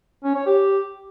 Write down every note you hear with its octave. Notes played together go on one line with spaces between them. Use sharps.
C#4
C#5
G4